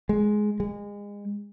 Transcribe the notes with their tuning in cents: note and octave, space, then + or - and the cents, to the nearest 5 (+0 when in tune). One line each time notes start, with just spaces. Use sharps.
G#3 +10
G#3 -30